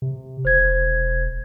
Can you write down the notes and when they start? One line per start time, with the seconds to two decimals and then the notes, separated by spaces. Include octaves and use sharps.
0.02 C3
0.45 E1 C5 G#6